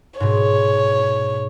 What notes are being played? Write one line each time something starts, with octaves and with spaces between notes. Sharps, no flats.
G#2 B2 C#5